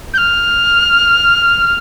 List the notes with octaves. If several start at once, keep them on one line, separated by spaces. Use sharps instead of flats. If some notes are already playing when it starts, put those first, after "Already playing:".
G6
F6